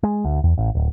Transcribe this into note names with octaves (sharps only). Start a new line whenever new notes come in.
G#3
D2
E2
A1
D1